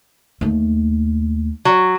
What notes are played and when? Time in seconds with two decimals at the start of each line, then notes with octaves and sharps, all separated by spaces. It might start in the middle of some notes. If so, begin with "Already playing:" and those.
0.41 D#2 A3
1.65 F#3